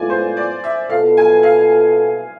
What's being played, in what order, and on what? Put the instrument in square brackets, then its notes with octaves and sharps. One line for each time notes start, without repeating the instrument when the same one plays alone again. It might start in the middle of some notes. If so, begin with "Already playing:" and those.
Already playing: [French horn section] A2 G#3 B3 F4 [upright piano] D5 G#5
[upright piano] C5
D5
E5
[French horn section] B2 B3 F4 A4 [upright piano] F5
[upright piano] G#5
F5